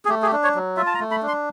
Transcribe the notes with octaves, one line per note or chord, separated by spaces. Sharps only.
G#4
A3 G4
G#4
G4
D4
C#5
F#3
F4 E5
A5
A#5
A3
B5
D4
C6